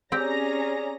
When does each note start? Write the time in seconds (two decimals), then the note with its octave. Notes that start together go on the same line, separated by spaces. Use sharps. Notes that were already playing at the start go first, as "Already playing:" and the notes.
0.12 C4 C#4 G4 G#4 D5 A#5 A#6